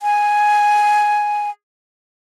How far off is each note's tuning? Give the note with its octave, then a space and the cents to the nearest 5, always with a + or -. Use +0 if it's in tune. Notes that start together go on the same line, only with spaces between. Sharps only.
G#5 +5